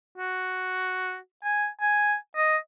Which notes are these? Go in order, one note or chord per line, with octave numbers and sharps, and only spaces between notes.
F#4
G#5
G#5
D#5